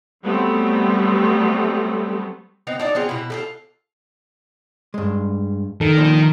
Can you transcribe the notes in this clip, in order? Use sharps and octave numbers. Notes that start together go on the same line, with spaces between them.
F#3 G3 A3 B3 C4
B3 C4 D#4
D4 D#4 D5
B3 C4 F4 G#4
B2 E4
F4 G4 A4
G2 G#3
D#3 A4
F3 A#3 D5